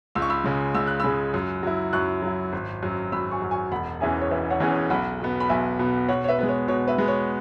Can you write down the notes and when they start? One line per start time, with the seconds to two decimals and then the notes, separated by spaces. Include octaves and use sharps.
0.15 C#2 E6
0.22 C#6
0.30 B5 E6
0.44 C#3 G#3
0.75 C#2 E6
0.87 F#6
1.00 C#3 G#3 B5 E6
1.34 F#2
1.63 F#3 E4
1.93 F#2 C#6 F#6
2.22 F#3 E4
2.53 G#1
2.83 F#2 F#3
3.12 G#1 B5 E6
3.31 G#5 C#6
3.42 F#2 F#3
3.51 G#5 C#6
3.71 E1 F#5 B5
4.01 E2 E3 C#4 G#4 E5 G#5
4.21 C#5
4.31 E1 B4 E5
4.50 C#5 F#5
4.60 E2 E3 C#4 G#4
4.71 C#5
4.90 B1 F#5 B5
5.20 B2 B3
5.40 B5
5.49 B1 E5 G#5
5.79 B2 B3
6.08 B2 C#5 F#5
6.24 C#5
6.28 B4 E5
6.39 G#3 B3 B4
6.49 C#5
6.68 B2 C#5
6.88 B4 E5
6.98 G#3 B3
7.08 C#5